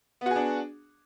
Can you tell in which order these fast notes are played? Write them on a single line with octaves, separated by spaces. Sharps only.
B3 F#4 G#4 D4